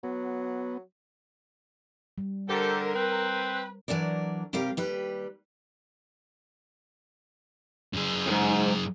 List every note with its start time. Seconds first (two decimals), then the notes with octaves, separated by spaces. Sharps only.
0.03 F#3 B3
2.18 G3
2.49 D3 G4 A4 A#4 C5
2.95 C4 B4
3.88 E3 F#3 D4 A#4 D5
4.53 C3 G3 G4 A#4 F5
4.77 D#2 G3 B4
7.93 F#2 G#4
8.27 F2 G#2